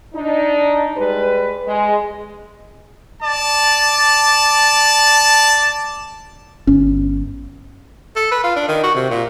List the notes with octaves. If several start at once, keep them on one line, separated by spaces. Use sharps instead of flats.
D4 D#4
G3 G#3 B4
G#3
D5 A5
G1 C#4
A4
B4
F4
D4
D#3
F#4
C3
A#2